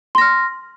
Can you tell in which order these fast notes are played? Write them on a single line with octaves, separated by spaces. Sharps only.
C6 A#6 F6